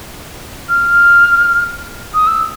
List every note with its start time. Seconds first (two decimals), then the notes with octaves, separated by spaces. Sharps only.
0.69 F6
2.14 D#6
2.27 E6